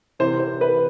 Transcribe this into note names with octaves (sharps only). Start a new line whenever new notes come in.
C3 E3 C5
C5
B4